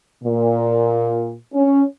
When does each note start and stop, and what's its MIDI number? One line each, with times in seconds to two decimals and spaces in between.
0.24 1.35 46
1.53 1.83 61